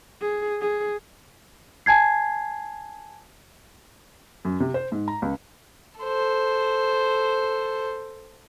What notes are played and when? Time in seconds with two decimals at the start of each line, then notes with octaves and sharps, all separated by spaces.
0.21 G#4
0.61 G#4
1.86 G#5 A5 G#6 C7
4.45 F#2
4.60 C3
4.74 C5
4.92 G#2
5.08 A#5
5.22 C#2
6.00 A4 C5